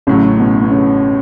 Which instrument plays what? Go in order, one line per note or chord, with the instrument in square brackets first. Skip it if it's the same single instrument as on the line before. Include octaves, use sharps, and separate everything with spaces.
[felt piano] A1 A2 F#3 [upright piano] C#3 C#4
[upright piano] B2 B3
B3
C#3 C#4